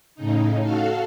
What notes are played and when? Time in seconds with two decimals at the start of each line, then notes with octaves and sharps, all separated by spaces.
0.15 A2 C#3 D#4
0.62 F#4 A4 F5